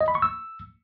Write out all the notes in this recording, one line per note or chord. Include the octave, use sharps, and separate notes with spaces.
D#5
B5
C#6
E6